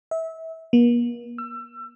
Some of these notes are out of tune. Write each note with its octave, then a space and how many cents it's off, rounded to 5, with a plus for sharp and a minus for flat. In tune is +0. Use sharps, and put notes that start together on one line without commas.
E5 -25
A#3 +45
E6 +30